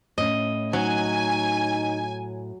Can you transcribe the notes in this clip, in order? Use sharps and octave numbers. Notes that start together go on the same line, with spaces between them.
A2 C#4 D#5
F#3 D#4 G#5